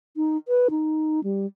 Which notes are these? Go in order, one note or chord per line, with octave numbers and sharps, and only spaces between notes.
D#4
B4
D#4
G3